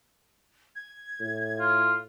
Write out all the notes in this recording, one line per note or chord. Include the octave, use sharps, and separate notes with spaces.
G#6
A2
F4